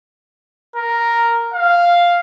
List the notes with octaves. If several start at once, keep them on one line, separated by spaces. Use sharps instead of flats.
A#4
F5